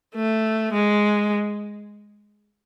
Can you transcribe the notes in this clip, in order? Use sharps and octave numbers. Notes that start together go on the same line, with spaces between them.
A3
G#3